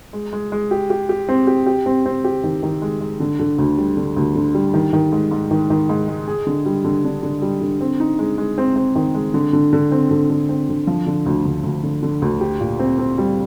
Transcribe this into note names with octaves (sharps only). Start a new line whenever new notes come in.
G#3
G#3
G#3
G4
G4
G4
C4
G4
G4
C4
C4
G4
D#3
D#3
G#3
G#3
D3
D3
D2
G3
D3
D2
D3
G3
D#3
D#3
G#2
G#2
D#3
D#3
G#2
G#3
G#4
D3
G3
D3
D4
D3
G3
D3
C4
D#4
G#3
G#3
C4
C4
D#3
G#3
D3
D3
D3
C4
D3
D3
C4
D3
F3
D3
D2
D2
D2
D3
D3
D2
G4
A#2
C4
C4
G3